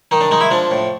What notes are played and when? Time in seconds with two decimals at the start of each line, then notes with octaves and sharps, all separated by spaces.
0.11 D#3 D#4
0.21 D4
0.31 G#3 D#4
0.41 E4
0.51 F3 D4
0.71 A2